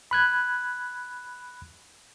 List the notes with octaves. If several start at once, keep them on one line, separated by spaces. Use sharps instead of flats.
B5 F#6 G#6